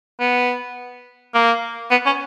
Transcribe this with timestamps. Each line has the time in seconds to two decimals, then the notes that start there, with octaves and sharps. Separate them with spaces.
0.20 B3
1.35 A#3
1.91 B3
2.06 C#4